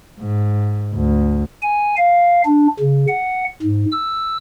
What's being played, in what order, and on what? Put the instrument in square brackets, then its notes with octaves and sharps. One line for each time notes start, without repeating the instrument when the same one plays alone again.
[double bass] G#2
D2
[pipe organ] G#5
F5
D4
C#3
F#5
G#2
E6